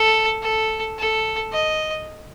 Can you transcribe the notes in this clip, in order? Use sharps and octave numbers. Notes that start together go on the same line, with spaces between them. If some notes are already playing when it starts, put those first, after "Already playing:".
Already playing: A4
A4
A4
D#5